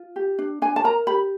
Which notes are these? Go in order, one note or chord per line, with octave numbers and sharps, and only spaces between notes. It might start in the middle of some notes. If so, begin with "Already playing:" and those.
Already playing: F4
G4
D4
D4 G#5
A5
A#4 A#5
G4 B5